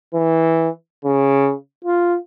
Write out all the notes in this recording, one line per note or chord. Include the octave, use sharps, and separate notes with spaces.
E3
C#3
F4